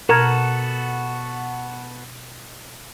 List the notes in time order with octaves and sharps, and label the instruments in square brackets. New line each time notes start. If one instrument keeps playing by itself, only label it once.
[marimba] B2 G#6 [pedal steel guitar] B3 F#4 A4 [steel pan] A#4